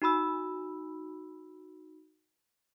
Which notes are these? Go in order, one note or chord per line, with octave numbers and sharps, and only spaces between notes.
D#4 F#4 B5 E6